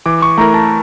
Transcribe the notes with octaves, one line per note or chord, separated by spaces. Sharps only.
E3 D6
C#6
A3 E4 A#4 A#5
A5